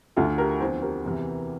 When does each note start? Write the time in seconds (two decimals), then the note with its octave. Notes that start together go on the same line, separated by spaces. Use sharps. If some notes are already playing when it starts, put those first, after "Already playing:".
0.16 D2 D3 A3 F4 A4
0.38 G4 A#4
0.60 E2 D3 F3 C4 A4 C5
0.82 G4 A#4
1.05 E2 C3 E3